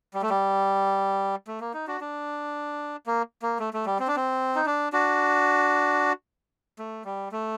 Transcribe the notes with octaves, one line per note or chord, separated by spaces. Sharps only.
G3
A3
G3
A3
A#3
D#4
D4 F#4
D4
A#3
A#3
A3
A3
G3
C4
D4
C4
D#4
D4
D4 F#4
A3
G3
A3